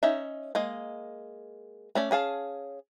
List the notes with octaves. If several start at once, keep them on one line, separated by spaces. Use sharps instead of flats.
C#4 D#4 D#5 E5
G#3 A#3 D#5
A3 C#4 D5
C#4 G#4 F5 A5